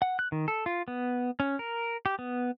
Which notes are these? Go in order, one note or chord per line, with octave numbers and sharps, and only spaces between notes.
F#5
F#6
D#3
A4
F4
B3
C#4
A#4
G4
B3